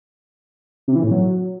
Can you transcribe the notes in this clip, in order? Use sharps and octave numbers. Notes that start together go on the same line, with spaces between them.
C3
E3
A2
F#3